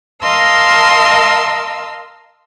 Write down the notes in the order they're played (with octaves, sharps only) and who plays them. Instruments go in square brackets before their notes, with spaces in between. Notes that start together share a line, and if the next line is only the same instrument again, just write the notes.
[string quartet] A#4 D#5 F5 A5 C6 E6